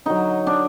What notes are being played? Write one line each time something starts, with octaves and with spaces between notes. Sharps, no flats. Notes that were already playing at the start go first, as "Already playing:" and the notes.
D3 F#3 D#4
D4